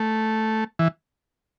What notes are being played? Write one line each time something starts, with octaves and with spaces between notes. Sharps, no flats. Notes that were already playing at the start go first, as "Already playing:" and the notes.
Already playing: A3
E3